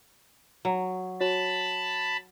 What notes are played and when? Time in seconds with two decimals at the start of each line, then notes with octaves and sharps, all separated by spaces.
0.65 F#3
1.21 F#4 C#5 A5 B5